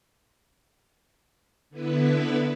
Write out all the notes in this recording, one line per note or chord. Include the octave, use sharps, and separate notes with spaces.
D3 B3 E4 B4